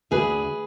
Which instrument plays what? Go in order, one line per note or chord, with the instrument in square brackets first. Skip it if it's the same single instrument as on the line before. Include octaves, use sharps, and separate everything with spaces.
[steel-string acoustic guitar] D2 G#4 B4